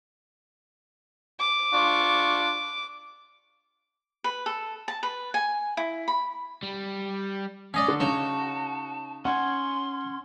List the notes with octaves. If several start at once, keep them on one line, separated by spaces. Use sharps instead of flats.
D6
D4 F4 C#6
B4
A4
A5
B4
G#5
E4
B5
G3
C#4 D5 D#5 F5
D3 F#4
C#3 D#4 C#5 A5
C#4 F#5 G#5 C6